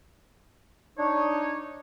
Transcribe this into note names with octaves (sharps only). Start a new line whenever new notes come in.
D4 D#4 C#5